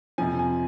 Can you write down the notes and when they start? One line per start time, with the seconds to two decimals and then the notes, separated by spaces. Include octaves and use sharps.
0.18 F2 C3 F3 C4 G#5
0.39 G#5